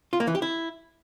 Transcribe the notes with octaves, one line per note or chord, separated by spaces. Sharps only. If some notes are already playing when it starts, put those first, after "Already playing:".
F4
A#3
E3
G4
E4